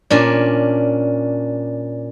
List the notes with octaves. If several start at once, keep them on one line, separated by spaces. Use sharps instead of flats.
A#2 C#4 D4